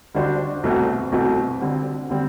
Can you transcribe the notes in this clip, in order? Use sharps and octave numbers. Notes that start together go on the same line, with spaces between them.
D3 G3 D4 F#4 C5
C2 B2 A3 C4 F#4
C2 B2 A3 C4 F#4
D3 G3 C4
D3 G3 C4